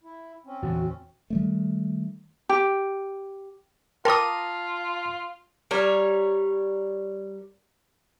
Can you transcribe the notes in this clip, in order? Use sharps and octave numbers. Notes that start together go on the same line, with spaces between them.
E4
C4 C#4
E2 A#2 D3 F#4
D#3 G3 A3
G4
F4 A#4 G5 A5 C6 D6 D#6
G3 A#4 C#5